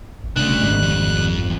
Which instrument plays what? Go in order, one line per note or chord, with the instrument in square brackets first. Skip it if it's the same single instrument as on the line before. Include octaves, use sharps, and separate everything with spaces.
[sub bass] G#1
[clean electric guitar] C2 C#3 [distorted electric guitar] A3 D4 [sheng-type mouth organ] F#6
[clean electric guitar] D#2 G#2 G3
[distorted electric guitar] F2